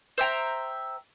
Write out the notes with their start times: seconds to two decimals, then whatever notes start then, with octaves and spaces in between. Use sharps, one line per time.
0.18 C5 E5 G5 A#5